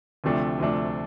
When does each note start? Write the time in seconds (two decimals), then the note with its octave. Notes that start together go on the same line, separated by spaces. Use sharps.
0.24 D2 C3 F3 A3 D4
0.60 D2 C3 F3 A3 D4